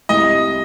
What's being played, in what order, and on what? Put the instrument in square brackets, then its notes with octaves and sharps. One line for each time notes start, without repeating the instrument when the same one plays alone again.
[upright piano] C2 [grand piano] D#5